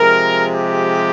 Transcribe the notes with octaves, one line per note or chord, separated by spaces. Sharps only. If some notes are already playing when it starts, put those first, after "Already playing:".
Already playing: C3 F3 G#3 A#4
G4